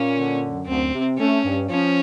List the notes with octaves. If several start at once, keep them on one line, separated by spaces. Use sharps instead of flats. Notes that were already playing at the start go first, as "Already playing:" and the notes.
Already playing: A#2 A#3 C#4
D3
F#2
D2 C4
C3
A3 C#4
G2
F3 C#4